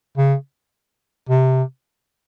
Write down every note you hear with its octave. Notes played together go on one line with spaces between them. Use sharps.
C#3
C3